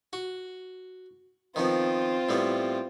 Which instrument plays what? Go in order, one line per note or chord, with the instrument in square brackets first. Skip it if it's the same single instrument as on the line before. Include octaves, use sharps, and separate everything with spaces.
[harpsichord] F#4
[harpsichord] D#3 F3 B3 [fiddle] C4 F4
[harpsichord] A2 G3 B3